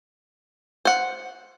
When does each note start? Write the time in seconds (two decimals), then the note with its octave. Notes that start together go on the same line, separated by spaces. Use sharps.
0.85 C5 F#5